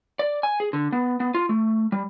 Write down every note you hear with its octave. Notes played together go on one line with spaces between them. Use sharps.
D5
G#5
G#4
D3
B3
B3
F4
A3
G3